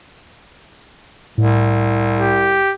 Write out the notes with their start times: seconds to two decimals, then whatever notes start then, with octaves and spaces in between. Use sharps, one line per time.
1.38 C2 A2
2.19 G4